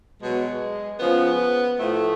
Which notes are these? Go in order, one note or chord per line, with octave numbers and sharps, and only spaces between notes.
B2 F#3 G#3
C#3 F3 B3
A2 F3 A3